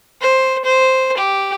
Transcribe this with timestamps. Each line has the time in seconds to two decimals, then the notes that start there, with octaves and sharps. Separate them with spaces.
0.21 C5
0.65 C5
1.17 G4